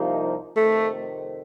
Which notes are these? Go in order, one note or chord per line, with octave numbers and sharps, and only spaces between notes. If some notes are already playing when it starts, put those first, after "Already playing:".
Already playing: C2 C3 F3 A#3 D#4
F2 C3 D#3 A3